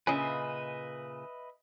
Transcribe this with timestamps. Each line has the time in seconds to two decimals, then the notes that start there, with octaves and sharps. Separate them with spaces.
0.07 A#2 C#3 B4 D#5 E5 G#5